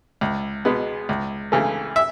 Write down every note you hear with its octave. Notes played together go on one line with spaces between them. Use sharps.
C#2
B2 G#3 B3
C#2
C#3 E3 A3
E5